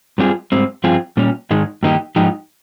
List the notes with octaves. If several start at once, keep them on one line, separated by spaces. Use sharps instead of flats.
G2 G3 C4 F4 G#4
G#2 G3 C4
G2 F3 C4 F4 G#4
A#2 G3 C#4
G#2 D#3 G#3
G2 D#3 A#3 D#4 G4
G#2 F3 D#4 G4